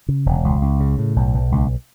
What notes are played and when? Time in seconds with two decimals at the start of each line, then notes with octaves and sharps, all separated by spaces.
0.08 C#3
0.26 E1
0.44 C#2
0.62 C#2
0.80 C#3
0.98 A2
1.16 B1
1.34 B1
1.52 C#2